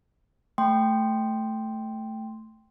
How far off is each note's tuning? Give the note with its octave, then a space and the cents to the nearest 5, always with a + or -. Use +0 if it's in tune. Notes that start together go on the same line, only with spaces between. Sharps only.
A3 +0 G5 +0 C6 +0